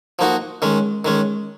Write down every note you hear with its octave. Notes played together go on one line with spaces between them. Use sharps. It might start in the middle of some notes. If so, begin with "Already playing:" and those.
F3 A#3 D#4 F#4
D#3 G#3 C#4
D#3 G#3 C#4